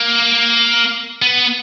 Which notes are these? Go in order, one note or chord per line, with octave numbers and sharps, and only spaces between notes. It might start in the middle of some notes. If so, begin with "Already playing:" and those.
Already playing: A#3
B3